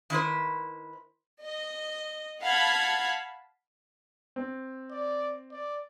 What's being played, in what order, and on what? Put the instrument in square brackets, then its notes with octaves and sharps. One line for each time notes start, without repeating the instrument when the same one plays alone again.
[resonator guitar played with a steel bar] D#3 E4 B4 C5
[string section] D#5
F5 F#5 A5 B5 G#6
[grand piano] C4
[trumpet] D5
D5